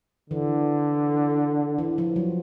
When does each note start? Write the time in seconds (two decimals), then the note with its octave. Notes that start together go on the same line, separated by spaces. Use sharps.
0.30 D3 E3
1.78 E3
1.98 F3
2.16 F#3